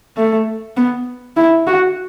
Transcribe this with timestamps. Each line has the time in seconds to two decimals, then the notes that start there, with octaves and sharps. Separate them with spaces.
0.17 A3
0.77 B3
1.36 E4
1.67 F#4